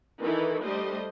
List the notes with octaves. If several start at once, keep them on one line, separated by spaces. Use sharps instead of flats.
D#3 E3 D#4 E4 A4
G3 A3 D4 C5 D#5